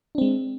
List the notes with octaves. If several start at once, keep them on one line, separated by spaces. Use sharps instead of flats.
G#3 C4 D4